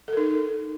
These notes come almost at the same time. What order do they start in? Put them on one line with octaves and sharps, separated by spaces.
A4 A#4 D#4